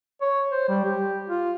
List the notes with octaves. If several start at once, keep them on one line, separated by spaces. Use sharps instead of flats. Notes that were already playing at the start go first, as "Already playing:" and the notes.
C#5
C5
G3
G4
F4